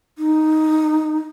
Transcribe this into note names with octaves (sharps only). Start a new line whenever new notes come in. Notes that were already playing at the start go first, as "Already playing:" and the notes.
D#4